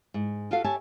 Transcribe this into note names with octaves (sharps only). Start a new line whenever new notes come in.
G#2
F4 F#4 A4 F5
G4 C#5 E5 G#5 A5